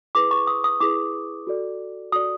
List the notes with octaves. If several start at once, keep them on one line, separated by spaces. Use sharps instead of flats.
E4 G#4 B4 D6
C#6
D#6
D#6
E4 G#4 B4 D6
F#4 A4 D5
F#4 A4 D5 D#6